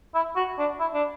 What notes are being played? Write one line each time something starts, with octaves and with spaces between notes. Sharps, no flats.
E4
F#4
D4
E4
D4